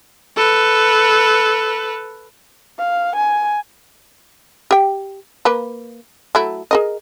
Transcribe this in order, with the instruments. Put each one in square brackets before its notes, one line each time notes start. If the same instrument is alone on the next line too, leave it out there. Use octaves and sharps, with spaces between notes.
[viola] A4 B4
[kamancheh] F5
G#5
[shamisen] G4 G5
A#3 B4
F#3 A3 E4
G#4 A#4 D#5